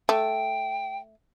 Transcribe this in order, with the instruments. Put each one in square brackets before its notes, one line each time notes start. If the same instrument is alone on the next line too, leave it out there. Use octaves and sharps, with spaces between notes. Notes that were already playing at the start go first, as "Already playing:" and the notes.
[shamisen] A3 [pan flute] G5